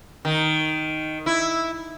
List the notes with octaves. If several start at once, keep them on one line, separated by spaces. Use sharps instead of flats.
D#3
E4